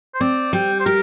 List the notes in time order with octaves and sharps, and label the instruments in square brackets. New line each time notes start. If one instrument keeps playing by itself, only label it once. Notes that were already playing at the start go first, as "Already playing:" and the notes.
[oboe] C5
[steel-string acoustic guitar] C4 [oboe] D5
[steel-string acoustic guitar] G3 [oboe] G5
[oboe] C5
[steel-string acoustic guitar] G4 [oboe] A#4